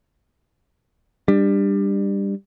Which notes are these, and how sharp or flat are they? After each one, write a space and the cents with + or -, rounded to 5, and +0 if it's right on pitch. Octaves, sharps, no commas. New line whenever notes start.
G3 +20 D4 +20